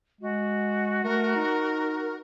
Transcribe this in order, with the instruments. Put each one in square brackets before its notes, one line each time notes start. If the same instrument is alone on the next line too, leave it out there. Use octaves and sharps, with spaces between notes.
[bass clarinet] G#3 [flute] F#4
[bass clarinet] A3 [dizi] A#4
[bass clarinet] D#4